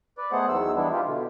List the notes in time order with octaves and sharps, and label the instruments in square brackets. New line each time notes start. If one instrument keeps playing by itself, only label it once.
[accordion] B4 D5
G#3 A3 B3 G#4 C5 F#5
E2 D#3 F#3 E6
E3 G3 G#3 B3 D4 E4
F4 G4
B2 D3